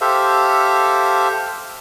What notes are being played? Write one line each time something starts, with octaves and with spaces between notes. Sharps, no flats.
G4 A4 C5 E5 F5